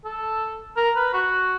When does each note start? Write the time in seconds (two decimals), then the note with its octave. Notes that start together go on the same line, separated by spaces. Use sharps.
0.04 A4
0.76 A#4
0.96 B4
1.13 F#4